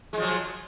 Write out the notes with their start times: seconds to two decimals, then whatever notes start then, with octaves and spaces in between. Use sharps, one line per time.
0.13 G#3
0.17 F3
0.22 F#3